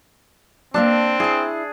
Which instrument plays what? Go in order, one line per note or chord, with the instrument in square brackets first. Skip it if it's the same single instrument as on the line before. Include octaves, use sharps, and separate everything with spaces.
[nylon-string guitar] A#3 A4 A5 [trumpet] C4 [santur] D4
[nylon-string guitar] E4 A5 [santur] G#4